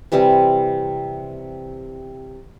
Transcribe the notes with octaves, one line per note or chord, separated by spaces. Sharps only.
C3 E3 G3 C4